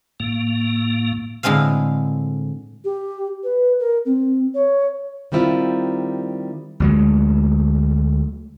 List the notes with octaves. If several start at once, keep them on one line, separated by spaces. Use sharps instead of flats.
A2 A#3
A2 D3 G#3 C4 F5
G4
B4
A#4
C4
C#5
D#3 G3 C4 E4 F4
D2 F#3 G#3